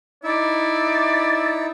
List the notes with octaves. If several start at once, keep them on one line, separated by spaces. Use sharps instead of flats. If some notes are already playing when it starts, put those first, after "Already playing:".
D#4 E4 D5 E5